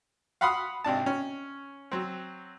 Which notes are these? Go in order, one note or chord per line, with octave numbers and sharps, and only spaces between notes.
F5 F#5 B5 C6 D#6 F6
G#1 C3 D4 A5
C#4
F#3 C4